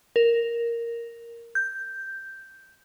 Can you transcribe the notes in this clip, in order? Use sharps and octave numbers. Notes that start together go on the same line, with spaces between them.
A#4
G6